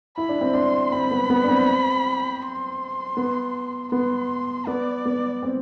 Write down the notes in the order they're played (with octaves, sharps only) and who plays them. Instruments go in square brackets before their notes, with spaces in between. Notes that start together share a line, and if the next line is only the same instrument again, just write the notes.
[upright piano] E4 [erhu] B5
[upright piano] D4
C4
[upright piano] D4 [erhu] C6
[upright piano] C4 [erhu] B5
[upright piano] B3
B3
D4
C4
[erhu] C6
[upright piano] B3
[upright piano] B3 [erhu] C6
[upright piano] B3 [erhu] D5
[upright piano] B3
C4